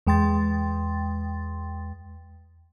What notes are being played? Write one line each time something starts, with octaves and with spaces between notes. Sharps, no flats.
E2 G#3 G5 C6 A6